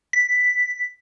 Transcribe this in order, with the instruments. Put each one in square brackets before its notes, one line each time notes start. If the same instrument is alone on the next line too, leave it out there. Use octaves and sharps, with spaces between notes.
[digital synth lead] B6